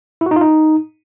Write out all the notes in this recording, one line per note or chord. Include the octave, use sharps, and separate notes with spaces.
E4
F#4
D#4
F4
D#4